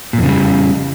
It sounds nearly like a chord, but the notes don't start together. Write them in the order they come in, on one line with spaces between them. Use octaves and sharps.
A#2 F2 C#3 G3